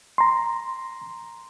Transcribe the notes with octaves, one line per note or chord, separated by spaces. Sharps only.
A#5 C6